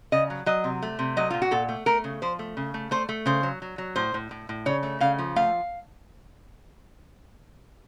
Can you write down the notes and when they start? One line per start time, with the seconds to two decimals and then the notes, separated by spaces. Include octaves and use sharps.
0.12 C#3 D#5
0.30 F#3
0.46 F#3 D#5
0.64 C3
0.82 A3
0.99 C3
1.17 F#3 D#5
1.30 A#2 F4
1.42 F#4
1.51 A#2 A4
1.69 A3
1.86 A3 A#4
2.04 C#3
2.22 F3 C5
2.39 A3
2.57 C#3
2.74 A3
2.91 A3 C5
3.09 A3
3.26 C#3 C5
3.43 F#3
3.62 F#3
3.78 F#3
3.96 A2 C5
4.14 A2
4.31 A2
4.49 A2
4.66 C#3 C#5
4.83 A3
5.00 C#3 F5
5.19 F3
5.36 A3 F5